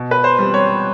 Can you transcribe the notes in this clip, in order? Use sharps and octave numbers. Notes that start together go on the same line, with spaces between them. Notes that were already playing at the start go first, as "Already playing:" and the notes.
Already playing: B2
B4
C5
G3 C4
C#5